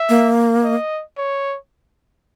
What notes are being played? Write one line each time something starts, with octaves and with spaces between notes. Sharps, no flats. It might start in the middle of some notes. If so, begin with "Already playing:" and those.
Already playing: E5
A#3
D#5
C#5